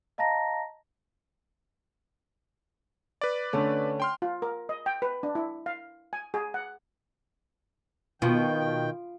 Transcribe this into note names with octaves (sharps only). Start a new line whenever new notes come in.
D#5 F5 A5 A#5 A#6
B4 D5
D3 A3 C#4
G5 C6 F6
F4
A#4
D#5
G5
B4
D4
E4
F5
G#5
G#4
F#5
B2 D#3 F4 G5